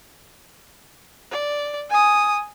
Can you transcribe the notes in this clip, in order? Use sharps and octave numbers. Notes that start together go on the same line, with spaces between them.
D5
G#5 D#6